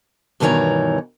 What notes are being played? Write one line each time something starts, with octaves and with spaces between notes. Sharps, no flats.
G2 B2 D#3 E3 C#5 A#5